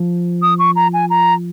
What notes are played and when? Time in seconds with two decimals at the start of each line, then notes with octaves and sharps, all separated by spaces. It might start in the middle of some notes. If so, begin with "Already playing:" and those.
Already playing: F3
0.42 D#6
0.59 C#6
0.76 A#5
0.94 G#5
1.10 A#5